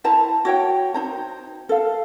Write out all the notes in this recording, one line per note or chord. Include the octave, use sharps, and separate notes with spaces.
E4 C5 A5 A#5
F#4 C#5 G5
D#4 C5 A#5
A4 F5